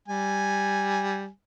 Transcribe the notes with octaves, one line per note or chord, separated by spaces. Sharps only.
G3 G#5